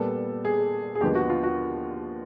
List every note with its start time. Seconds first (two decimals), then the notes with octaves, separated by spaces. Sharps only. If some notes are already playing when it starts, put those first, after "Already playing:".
Already playing: A#2 G3 B3 A4
0.45 G#4
0.95 G#4
1.01 D#2 D3 F3 G#3 B3 G4
1.15 F#4
1.30 F4
1.43 F#4